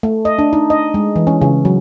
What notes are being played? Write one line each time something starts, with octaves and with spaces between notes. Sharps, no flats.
A3
D#5
D4
D#4
D#5
G#3
E3
C#4
C#3
F#3